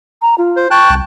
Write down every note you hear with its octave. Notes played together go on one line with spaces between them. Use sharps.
A#5
F4
C5
G5 A5 C#6 F#6
C2